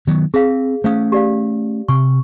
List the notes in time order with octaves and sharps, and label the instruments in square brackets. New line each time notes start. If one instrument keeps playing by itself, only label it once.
[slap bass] D#3 F#3 B3
[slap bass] C4 [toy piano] G#4 F5
[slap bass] A3 C#4 [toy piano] C5 F5 D#6
[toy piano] G4 D5 F5
[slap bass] C3 [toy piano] C#6